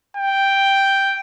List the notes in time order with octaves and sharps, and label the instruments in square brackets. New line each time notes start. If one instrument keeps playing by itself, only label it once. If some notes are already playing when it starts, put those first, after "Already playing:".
[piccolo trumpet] G5